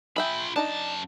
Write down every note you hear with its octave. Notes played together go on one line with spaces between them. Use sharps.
F4 G#4 E5 G5 B5
F#2 D4 D#4 A5 A#5